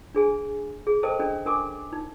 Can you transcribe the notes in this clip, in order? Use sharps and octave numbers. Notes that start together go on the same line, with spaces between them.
D4 G#4 G#5
G#4
A4 A#4 C5 D#5 G5 A5
C#4 D4 D#5 G5
D4 A#4 G#5 C#6 D6
D#4